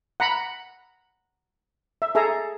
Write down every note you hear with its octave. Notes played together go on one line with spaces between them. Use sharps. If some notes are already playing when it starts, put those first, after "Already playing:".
F#5 A#5 B5
E5
G#4 A4 E5 A#5